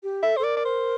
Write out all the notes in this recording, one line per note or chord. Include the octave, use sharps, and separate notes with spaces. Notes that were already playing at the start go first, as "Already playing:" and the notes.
G4
A4 E5
C5
A4
A#4 D5
D5
C5